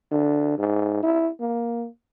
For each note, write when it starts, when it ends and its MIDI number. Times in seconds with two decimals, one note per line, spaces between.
0.12 0.57 50
0.58 0.98 44
1.03 1.30 64
1.40 1.87 58